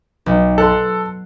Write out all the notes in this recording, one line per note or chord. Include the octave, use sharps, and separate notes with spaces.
B1
A4 C6 F#6